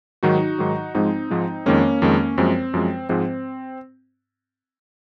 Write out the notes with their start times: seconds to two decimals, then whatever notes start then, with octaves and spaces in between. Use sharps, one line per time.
0.23 G#2 D#3 F#3 D#4 F#4
0.59 G#2 D#3 F#3
0.95 G#2 F3 G#3 C4 D#4
1.31 G#2 F3 G#3
1.66 F2 D#3 G#3 A#3 C#4
2.02 F2 D#3 G#3
2.38 F#2 F3 G#3 C4
2.74 F#2 F3 G#3
3.09 G#2 F3 G#3 C4